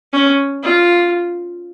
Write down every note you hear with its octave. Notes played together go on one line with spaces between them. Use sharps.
C#4
F4